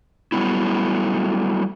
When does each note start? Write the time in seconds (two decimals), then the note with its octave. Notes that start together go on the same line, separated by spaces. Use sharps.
0.32 F#3 G3 A3 B3 E4